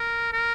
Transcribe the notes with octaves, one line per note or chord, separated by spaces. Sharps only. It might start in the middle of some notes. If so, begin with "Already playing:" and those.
Already playing: A#4
A#4